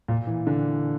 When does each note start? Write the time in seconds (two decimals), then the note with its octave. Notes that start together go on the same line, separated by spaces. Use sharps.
0.08 A#2
0.27 E3
0.47 D3